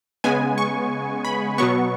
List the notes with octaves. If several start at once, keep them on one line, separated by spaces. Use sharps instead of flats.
C#3 G#3 B3 G#5
C#6
B5
B2 F#3 B3 C#6